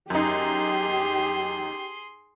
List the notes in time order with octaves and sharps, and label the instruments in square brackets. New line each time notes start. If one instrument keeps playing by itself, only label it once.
[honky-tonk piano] F#2 D#4 [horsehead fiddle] G4 [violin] G#4 C6